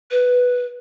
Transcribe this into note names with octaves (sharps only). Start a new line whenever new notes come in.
B4